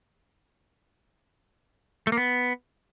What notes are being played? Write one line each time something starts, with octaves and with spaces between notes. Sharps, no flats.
A3
A#3
B3